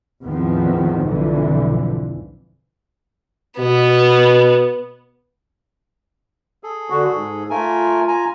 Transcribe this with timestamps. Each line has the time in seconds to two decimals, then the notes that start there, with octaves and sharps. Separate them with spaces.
0.23 E2 A2 D#3 F3 B3 C4
1.06 B1 F2 G#2 D3 E3 F3
3.59 B2 B3
6.63 G#4 A4
6.90 D3 F#4
7.12 G#2
7.50 A3 F4 A#4 G#5
8.08 G#5 A#5